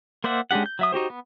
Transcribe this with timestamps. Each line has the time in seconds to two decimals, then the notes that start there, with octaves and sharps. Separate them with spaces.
0.24 A#3 C5 D5 E5 F#5
0.51 G#3 C#4 D4 G4 F#5
0.66 G6
0.79 F#3 E5 D#6
0.92 D#4 F#4 G4 C5
1.10 B3